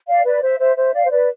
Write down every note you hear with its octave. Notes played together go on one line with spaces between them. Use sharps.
D5 F5
B4 D5
C5 E5
C5 E5
C5 E5
D5 F5
C5
B4 D5